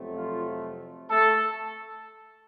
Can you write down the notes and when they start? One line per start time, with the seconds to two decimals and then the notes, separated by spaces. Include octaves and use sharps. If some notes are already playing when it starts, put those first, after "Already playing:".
Already playing: F2 C3 F#3 A3
0.16 F3 F4
1.10 A3 A4